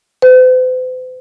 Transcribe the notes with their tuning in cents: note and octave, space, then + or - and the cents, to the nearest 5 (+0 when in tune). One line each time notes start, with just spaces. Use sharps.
C5 -45